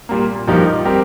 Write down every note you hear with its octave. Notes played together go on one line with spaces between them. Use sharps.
A#2 G3 A#3
G2 F3 D#4 G4 A#4
G3 C4 G4 A#4